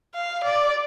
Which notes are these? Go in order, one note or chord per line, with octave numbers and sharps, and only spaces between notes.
F5
D5